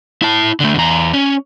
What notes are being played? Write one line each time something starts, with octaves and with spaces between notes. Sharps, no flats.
E4 A5
D3 A3
E2 A#5
C#4